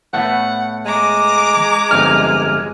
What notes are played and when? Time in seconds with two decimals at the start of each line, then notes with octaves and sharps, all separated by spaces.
0.13 A2 A3 B3 F#5
0.85 G#3 A#5 D6
1.91 G1 F2 D#4 F6